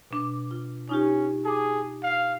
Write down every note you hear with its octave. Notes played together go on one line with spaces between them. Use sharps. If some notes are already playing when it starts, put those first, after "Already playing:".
B2 D4 D6
F4
C#4 D#4 F4 G4
G#4 A5 D6
F5